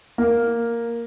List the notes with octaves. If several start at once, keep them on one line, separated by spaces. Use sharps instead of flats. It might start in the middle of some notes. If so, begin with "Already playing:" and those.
A#3